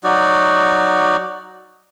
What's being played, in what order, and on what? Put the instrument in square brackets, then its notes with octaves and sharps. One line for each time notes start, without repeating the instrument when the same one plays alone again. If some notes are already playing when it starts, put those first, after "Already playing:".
[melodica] F#3 D#4 F#4 D5